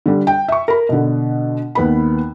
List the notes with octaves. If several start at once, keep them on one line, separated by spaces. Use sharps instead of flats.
D3 G3
G5
E5 C#6
A#4 B5
B2 D3
D#2 B3 B5